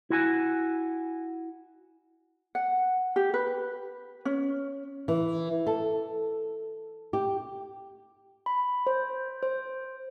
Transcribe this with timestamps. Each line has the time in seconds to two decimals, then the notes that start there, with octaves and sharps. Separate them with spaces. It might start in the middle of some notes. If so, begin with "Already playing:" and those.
0.10 E4 F#4 G#5
2.55 F#5
3.16 G4
3.34 B4
4.25 C#4
5.08 E3
5.67 A4
7.13 G4
8.46 B5
8.87 C5
9.43 C5